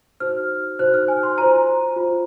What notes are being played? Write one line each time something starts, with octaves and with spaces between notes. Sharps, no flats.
D#4 F#4 C5 F6
D#4 F#4 C5 F#6
F6
G#5
C6
F4 C5 A#5
F4 C5